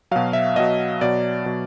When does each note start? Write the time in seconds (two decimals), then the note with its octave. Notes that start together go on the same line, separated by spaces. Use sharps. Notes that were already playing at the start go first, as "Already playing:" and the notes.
0.11 B2 F#3 F5
0.33 E5
0.56 B2 F#3 D#5
1.01 B2 F#3 D5
1.46 B2 F#3